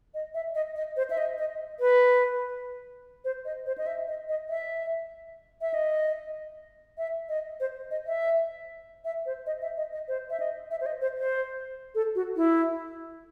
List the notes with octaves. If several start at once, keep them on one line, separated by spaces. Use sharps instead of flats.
D#5
E5
D#5
D#5
C5
E5
D#5
D#5
B4
C5
D#5
C5
D#5
E5
D#5
D#5
E5
E5
D#5
E5
D#5
C5
D#5
E5
E5
C5
D#5
E5
D#5
D#5
C5
E5
D#5
E5
C5
D#5
C5
C5
A4
F#4
E4